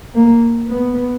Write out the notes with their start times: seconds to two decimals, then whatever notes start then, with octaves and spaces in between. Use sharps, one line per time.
0.15 A#3
0.67 B3